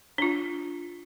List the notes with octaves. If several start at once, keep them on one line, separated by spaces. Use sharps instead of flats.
D4 F4